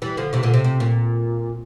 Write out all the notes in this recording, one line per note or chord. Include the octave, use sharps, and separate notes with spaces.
E3 G3
D3 F3
C3 E3
A#2 D3
C3
C3
A#2